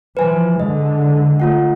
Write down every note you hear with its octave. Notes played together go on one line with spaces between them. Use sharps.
E3 F3 B4 G#5
D3 G#3 D#5
A3 F4 F#5